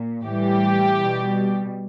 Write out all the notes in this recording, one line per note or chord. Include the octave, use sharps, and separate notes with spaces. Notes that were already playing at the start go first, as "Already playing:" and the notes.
Already playing: A#2
A2 E3 G3 G4
B2 G3